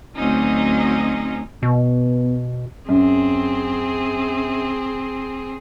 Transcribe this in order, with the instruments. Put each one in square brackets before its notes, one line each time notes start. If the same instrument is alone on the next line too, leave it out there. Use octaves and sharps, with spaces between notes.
[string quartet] D2 F#3 C4 C#4 D#4 D#5
[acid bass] B2 [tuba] B3
[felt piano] F#2 [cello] C4 G#4